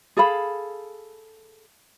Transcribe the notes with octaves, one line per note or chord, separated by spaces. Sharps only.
G#4 A4 F5 B5